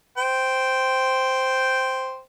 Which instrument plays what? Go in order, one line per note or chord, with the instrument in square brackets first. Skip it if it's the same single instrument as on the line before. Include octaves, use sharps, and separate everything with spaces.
[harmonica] C5 G5